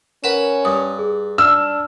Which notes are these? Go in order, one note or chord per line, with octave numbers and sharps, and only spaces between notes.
C#4 A#4 B4 F#5 B5 E7
G2 D#6
G#4
D4 E6 F6